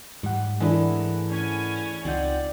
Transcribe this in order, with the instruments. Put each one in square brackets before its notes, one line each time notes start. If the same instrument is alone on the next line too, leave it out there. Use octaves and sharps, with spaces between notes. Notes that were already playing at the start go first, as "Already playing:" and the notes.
[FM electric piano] G#2 F#5 [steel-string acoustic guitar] G3
[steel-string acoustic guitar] E3 A3 A#4 [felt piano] G#3 D4 E4
[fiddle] C#4 G#5
[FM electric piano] C#2 D#4 G6 [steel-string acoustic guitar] C4 F4 F#5 [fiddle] D5